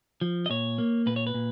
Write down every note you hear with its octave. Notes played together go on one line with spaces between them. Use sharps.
F3
D#5
A#2 C#5
A#3
A#2 B4
C#5
B4
A#2